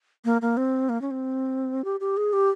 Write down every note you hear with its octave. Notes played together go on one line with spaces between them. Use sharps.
A#3
A#3
C4
A#3
C#4
C4
G4
G4
G#4
G4